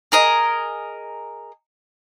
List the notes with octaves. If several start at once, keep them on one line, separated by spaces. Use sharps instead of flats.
G#4 A#4 D#5